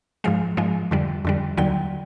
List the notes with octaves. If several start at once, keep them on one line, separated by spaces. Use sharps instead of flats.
G#2 F3 G#3 F5
G#2 F3 G#3
F2 D3 G3
F2 D3 G3
D#2 D3 F#3 G5